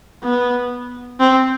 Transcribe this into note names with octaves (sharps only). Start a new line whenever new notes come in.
B3
C4